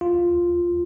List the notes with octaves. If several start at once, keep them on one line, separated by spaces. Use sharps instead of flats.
F4